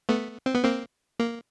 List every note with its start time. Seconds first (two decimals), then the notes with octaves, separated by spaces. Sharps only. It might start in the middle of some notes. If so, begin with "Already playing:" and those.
0.09 A3 B3
0.46 C4
0.55 B3
0.64 A#3 C4
1.19 A#3